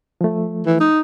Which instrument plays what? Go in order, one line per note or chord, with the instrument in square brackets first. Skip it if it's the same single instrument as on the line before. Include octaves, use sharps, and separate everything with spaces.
[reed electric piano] F3 A3
[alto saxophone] E3
D#4